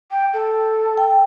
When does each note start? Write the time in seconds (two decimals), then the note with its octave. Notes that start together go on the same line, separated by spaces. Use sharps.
0.11 G5
0.33 A4
0.98 G5